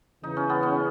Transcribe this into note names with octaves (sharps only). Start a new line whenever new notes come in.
E2 C#3 E3 D#4
C#4
B3
C#4